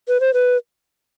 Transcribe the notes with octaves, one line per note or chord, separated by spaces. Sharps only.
B4
C5
B4